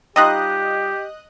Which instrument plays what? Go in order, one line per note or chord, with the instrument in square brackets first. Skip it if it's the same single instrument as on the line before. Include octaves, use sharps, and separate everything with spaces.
[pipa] G3 D#4 F4 [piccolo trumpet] G4 [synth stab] D#5 D#6 F#6